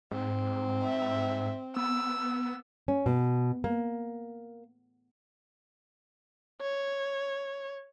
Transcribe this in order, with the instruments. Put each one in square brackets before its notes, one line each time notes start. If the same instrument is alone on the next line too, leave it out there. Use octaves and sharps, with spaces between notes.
[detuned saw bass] G#2 [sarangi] C4
[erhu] E5
[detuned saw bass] B3 [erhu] E6
[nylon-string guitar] C#4
B2
A#3
[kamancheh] C#5